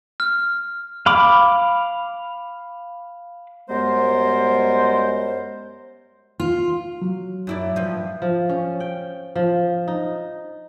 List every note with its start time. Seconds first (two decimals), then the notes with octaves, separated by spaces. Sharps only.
0.20 F6
1.06 F5 B5 D6
3.69 F#2 G3 G#3 B3 A#4 C5
6.40 F4
7.02 F#3
7.47 F#2 E4 D5
7.76 G2 F3
8.22 F3
8.49 C#4
8.80 G5
9.36 F3
9.88 D#4